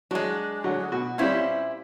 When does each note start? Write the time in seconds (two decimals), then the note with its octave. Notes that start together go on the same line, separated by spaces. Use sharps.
0.11 F#3 G#3 D4
0.64 D3 F#3
0.92 B2 F#4
1.18 A#2 G3 C4 C#4 E4 C5